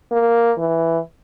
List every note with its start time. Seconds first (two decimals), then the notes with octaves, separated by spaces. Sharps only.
0.12 A#3
0.58 E3